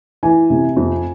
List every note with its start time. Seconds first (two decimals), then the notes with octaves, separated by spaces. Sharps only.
0.23 E3 G#5
0.50 C3
0.77 F2